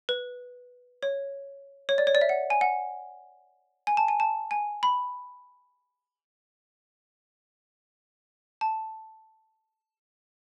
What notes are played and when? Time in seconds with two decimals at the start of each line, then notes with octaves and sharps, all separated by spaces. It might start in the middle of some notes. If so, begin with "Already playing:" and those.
0.09 B4
1.03 C#5
1.89 C#5
1.98 D5
2.07 C#5
2.15 D5
2.21 E5
2.29 F#5
2.50 G#5
2.61 F#5
3.87 G#5
3.97 A5
4.08 G#5
4.20 A5
4.51 G#5
4.83 B5
8.61 A5